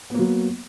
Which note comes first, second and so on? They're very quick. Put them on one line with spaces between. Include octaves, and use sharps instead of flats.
B3 A#3 F#3